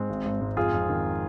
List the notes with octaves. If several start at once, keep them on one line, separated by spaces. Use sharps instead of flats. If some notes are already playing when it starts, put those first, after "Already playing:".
Already playing: G#2 G#3 C4
G#1
G#1
G#2
F2 F4 G#4
F2
D#3